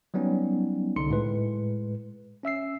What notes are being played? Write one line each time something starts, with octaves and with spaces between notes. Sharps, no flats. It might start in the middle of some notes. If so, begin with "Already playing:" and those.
F#3 G3 B3 C#4 D#4
C2 D3 D#4 C6 C#7
A2 G#3 B4
C#4 E5 E6 C7